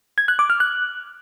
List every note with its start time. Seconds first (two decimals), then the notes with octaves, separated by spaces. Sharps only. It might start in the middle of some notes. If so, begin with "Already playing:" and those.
0.18 G#6
0.28 F#6
0.39 D6
0.50 F6
0.60 F#6